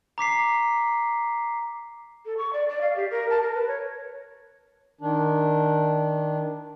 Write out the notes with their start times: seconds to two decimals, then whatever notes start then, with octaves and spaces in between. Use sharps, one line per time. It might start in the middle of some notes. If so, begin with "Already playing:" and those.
0.18 A#5 D6 B6 C7
2.26 A4
2.37 C#6
2.53 D5
2.69 D5
2.81 F5
2.96 G4
3.11 A#4
3.30 A5
3.43 A#4
3.55 B4
3.68 C#5
5.01 D#3 D4